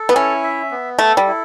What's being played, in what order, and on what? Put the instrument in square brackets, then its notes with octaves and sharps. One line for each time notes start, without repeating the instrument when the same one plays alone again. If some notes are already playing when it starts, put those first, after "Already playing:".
Already playing: [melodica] A4
[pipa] B3
[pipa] C#4 [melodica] E4
[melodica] E5
B3
[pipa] A3 [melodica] A4
[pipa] G3
[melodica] E4